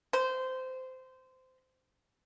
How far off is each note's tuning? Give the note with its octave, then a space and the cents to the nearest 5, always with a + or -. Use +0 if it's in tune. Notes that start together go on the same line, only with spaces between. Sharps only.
C5 -20